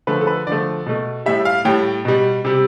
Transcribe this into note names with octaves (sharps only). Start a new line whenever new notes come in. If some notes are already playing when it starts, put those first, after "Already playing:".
D3 F3 A3 B4
A4
B4
D3 F3 A3 D5
B2 A3
A2 G3 E5
F5
A2 G3 G5
B2 G3
C3 G3